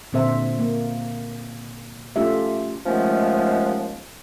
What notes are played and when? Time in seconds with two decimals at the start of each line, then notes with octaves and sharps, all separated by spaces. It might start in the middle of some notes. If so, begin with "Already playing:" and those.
0.13 A#2 D3 C4 C5 E5
0.59 A#3
2.16 A3 C#4 F4 G4 E5
2.86 D#2 F3 G#3 A3 B3 C#4